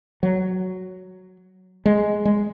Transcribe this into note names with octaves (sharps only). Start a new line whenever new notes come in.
F#3
G#3
G#3